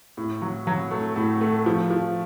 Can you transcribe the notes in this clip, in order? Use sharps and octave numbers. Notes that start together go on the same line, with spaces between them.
A2
F#3
F#3
A3
A2
A3
F3
F3